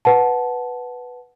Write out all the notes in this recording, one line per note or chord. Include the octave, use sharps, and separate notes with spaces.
B4 F#5 A5